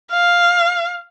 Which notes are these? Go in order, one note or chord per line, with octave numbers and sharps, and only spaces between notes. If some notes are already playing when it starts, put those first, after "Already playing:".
F5